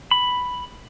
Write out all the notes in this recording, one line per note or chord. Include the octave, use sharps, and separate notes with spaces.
B5